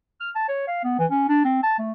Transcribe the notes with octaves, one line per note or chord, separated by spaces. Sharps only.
F6
A5
C#5
F5
B3
E3
C#4
D4
C4
A5
A3